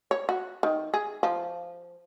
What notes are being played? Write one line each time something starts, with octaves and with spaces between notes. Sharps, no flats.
C#5
F#4
D#3
G#4
F3